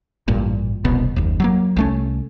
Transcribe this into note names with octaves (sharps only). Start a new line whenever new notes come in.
A1 G2 A#2
E1 C2 B2 B3
F#1 D#2
F#3 G3 A#3
C2 A3 C#4